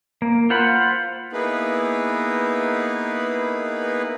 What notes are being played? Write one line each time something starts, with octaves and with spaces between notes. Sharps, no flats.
A#3
F4 C5 F#5 B5
A#3 B3 D#4 E4 G#4 B4